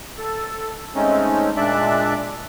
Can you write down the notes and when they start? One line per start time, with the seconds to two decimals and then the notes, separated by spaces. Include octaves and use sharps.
0.18 A4
0.95 G#3 A3 C4 C#4 D#4
1.57 A#2 G#3 D4 D5 E5 F#6